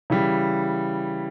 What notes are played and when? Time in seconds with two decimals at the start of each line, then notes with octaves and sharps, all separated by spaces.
0.10 C#3 E3 G3